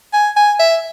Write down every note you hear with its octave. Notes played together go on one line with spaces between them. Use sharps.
G#5
G#5
E5